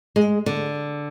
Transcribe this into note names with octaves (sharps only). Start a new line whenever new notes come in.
G#3
D3